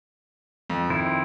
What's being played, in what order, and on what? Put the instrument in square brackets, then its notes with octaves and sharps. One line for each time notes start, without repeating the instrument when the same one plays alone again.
[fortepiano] F2
[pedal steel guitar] D#3 C4 E4